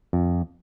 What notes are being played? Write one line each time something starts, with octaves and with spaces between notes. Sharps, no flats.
F2